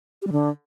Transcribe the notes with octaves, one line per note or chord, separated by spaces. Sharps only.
G4
G3
D3